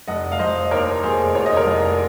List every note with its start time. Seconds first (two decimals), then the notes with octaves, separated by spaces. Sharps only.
0.08 F1 D#5 F#5
0.32 F5
0.39 F1 C5 D#5
0.71 D#2 A#4 C#5
1.03 F1 G#4 C5
1.35 F1 C#5
1.46 D#5
1.57 A#4 C#5
1.66 F1